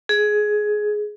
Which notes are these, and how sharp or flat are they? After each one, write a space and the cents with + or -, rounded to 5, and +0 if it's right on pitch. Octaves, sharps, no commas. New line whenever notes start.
G#4 +15